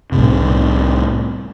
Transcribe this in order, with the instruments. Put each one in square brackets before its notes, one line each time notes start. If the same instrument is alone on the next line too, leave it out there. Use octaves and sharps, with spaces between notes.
[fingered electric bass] C2 A2 C3